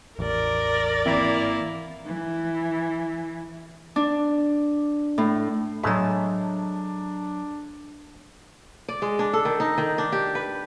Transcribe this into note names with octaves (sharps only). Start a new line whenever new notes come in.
A1 E2 A#4 D5
G#1 E3 A#3 C4 E4
E3
D4
A2
A2 F#3 G#3 A3 D4 A4 A5 B5
D5
G#3
D4
A4
D#3
D#4
D#3
D4
G4
B4